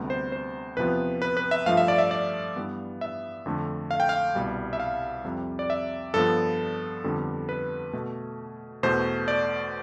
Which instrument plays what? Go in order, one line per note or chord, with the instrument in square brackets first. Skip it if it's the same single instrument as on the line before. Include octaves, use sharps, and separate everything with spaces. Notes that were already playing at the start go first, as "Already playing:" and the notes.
Already playing: [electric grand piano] D2 C3 G3 B3
C5
C5
E2 C3 F3 B3 B4
B4
B4
E5
G2 F3 A3 F5
E5
D5
E5
D5
G2 E3 G3 B3
E5
F2 D3 A3
F5
G5
F5
C2 B2 G3
E5
F5
F2 C3 G3
D5
E5
G2 F3 B3 A4
F2 D3 G3 B3
B4
B2 A3
E2 B2 A3 C5
D5